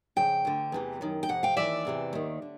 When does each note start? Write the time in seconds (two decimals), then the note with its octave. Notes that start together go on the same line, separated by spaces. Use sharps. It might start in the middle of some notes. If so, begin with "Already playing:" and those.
0.16 F2 C#3 G5
0.45 D2 D3
0.72 E2 C3 E3
1.01 F#2 D#3
1.23 G5
1.29 F2 C3 F#5
1.43 F5 G5
1.57 D#2 C#3 E3 D5 E5
1.85 E2 C3 E3
2.13 D#2 D#3
2.42 D3